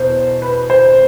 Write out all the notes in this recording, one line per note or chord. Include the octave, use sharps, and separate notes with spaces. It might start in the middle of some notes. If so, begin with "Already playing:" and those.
Already playing: E2 B2 C5
B4
C5